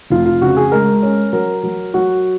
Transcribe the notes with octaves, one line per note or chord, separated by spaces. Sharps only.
F1 F4
F4
C#3 F#4
G#4
G#3 A#4
C#4
F#3 A#4
F#3
F#3 F#4